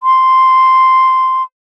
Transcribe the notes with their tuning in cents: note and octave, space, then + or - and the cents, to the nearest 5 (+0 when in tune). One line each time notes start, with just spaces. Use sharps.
C6 -5